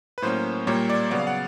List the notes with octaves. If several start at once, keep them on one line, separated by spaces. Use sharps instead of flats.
B4
A2 F#3 A#3 C#4 C5
A#2 G3 A#3 C#5
D5
C#3 F#3 B3 D5
F5
F#5